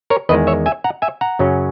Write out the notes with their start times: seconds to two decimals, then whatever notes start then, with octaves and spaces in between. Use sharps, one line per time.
0.10 A#4 C#5
0.29 E2 D#3 G#3 B4 D#5
0.47 C#5 E5
0.66 E5 G#5
0.84 F#5 A#5
1.02 E5 G#5
1.21 F#5 A#5
1.39 F#2 C#3 F#3 C#4